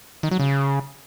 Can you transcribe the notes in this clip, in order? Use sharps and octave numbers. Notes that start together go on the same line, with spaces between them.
D#3
F#3
C#3